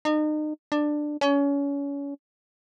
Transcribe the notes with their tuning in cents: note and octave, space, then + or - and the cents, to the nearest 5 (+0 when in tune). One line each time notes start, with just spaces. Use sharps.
D#4 -35
D4 +15
C#4 +30